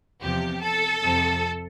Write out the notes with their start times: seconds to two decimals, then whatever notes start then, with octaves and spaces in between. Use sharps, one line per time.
0.21 E2 C3 F3 G4
0.62 A4
1.03 F2 C3 F3